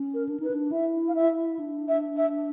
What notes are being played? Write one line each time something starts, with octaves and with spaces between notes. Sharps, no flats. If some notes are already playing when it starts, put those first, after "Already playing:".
Already playing: C#4
A#4
D4
D#4 B4
D4
E4 E5
F5
E5
D4
E5
E5